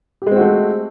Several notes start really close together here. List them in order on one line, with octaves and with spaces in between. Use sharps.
G4 G#3 C4 F#4 A3